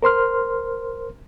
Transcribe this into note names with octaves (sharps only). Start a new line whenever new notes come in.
A#4 C5 C6 F6